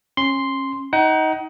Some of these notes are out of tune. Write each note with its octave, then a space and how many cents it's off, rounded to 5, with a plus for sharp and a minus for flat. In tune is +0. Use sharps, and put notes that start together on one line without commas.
C#4 -30 C6 +0
D#4 +20 F#5 +35